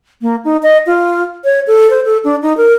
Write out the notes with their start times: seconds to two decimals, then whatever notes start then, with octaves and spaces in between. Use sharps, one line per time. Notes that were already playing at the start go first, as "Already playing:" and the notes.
0.22 A#3
0.45 D#4
0.63 D#5
0.87 F4
1.44 C#5
1.67 A4
1.90 C5
2.05 A4
2.24 D4
2.42 D#4
2.57 A#4